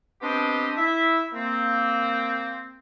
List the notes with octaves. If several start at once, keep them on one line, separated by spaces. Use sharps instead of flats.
B3 C4 D4 G4 C5 D#5
E4 E5
A#3 C4